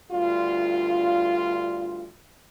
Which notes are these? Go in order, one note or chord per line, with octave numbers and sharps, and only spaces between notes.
D2 G2 F4